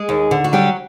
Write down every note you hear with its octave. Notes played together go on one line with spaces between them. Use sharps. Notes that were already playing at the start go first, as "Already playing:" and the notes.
Already playing: G#3 G#4
D#2
D3
F#4
F#3 G3 G4